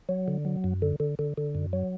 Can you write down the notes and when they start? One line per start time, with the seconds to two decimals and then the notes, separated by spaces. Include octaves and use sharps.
0.09 F#3
0.28 D3
0.45 F#3
0.64 F#2
0.82 D3
1.00 D3
1.19 D3
1.38 D3
1.55 F#2
1.73 F#3